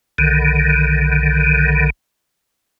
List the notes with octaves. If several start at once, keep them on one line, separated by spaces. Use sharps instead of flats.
B1 D3 D#3